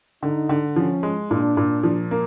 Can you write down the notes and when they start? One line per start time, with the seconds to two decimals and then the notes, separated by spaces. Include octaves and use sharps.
0.23 D3 D#4
0.49 D3
0.76 F3 C#4
1.03 G#3
1.30 A#2 D4
1.57 A#2
1.84 F3
2.11 A#3